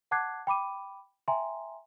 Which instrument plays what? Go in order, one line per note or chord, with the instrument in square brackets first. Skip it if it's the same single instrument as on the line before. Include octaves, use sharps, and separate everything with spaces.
[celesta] F#5 A5 D6 F#6 G#6 C7
G5 B5 D6 D#7
E5 G5 G#5 A#5 C6